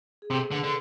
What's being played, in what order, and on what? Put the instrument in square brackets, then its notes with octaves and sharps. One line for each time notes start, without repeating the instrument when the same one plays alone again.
[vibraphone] G#4
[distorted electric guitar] C3 [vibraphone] A4
[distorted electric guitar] D3 [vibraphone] B4
[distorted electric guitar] D3